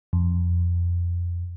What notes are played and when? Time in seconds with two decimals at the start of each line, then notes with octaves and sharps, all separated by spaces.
0.13 F2